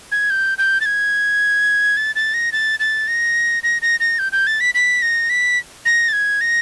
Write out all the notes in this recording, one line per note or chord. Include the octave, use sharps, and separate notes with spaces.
G#6
G6
G6
A6
G#6
A6
A6
A#6
A6
A6
A#6
A#6
A#6
A#6
G6
G6
A6
B6
B6
A#6
B6
A#6
A6
G#6
A#6